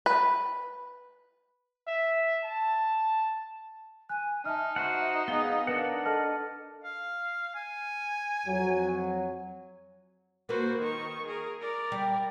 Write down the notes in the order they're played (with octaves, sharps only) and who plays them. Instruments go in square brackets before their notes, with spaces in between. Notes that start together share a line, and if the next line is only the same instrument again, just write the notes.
[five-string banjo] B4
[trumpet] E5
A5
[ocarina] G#5 [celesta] F#6
[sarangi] D#4 [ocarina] E5 [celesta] A5 F6
[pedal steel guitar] F#4 C5 F#5
[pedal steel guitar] B3 G#4 [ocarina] F5 [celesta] G7
[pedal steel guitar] D4 A#4 F#5 [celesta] B4
[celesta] A4 A5 F6 [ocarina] D#5
[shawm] F5
G#5
[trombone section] F2 F#3
[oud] A#3 B4 [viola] F#4 C5
[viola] D#3 C#6
G#4 A#4
A#4 D5
[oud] G3